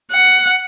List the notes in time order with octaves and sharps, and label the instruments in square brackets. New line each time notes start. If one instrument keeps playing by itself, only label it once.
[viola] F#5